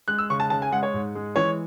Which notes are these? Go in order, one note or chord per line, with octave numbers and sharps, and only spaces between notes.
G#3 F#6
E6
C#3 C#6
A5
C#3 A5
G#5
G#3 F#5
C#5
G#2
G#3
E3 C#5